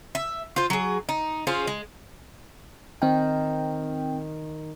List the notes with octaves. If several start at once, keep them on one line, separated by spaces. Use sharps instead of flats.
E5
F4 C5
F#3 G#4
D#4
C#4 F4 G#4 C5
G#3
D#3 C4 G5